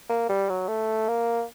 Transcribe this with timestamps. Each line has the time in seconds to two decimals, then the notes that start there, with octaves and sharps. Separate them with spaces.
0.09 A#3
0.29 G3
0.49 F#3
0.68 A3
1.08 A#3